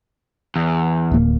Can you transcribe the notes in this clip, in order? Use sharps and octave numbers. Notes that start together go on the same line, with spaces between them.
E2
D1 A#3